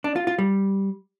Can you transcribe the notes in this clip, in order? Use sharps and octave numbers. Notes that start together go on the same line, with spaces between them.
D4
F4
F4
G3